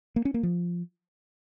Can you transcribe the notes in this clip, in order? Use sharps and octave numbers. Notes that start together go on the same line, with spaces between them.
A#3
C#4
A#3
F3